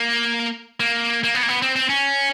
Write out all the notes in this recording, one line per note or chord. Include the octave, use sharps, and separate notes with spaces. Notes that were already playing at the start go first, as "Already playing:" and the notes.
Already playing: A#3
A#3
A#3
B3
A#3
B3
C4
C4
C#4